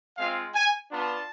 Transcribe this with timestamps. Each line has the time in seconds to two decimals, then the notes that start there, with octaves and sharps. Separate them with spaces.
0.17 G#3 C4 F4 F5
0.54 G#5
0.91 B3 D4 F4 A5